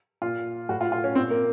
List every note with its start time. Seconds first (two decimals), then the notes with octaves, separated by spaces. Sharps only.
0.22 A#2 F4
0.69 A2 F#4
0.81 F4
0.92 F4
1.04 C#4
1.15 A#2 C4
1.30 A#3